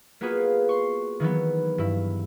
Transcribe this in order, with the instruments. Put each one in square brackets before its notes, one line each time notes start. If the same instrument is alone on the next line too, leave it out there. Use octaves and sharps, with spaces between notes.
[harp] A#3 B3 F4 F#4 G#4 B4
C6 C#6
D#3 E3 F#3 B3
G2 E4